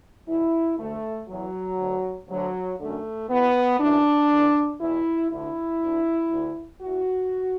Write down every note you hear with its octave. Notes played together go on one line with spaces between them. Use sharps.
E2 B2 E4
D2 D3 A3
E2 E3 F#3
D2 D3
D2 D3 F#3
F#2 D3 A3
E2 B2 B3
F#2 E3 D4
E2 D3
E2 B2 E4
D2 D3 E4
D2 D3
D2 D3
E2 E3 F#4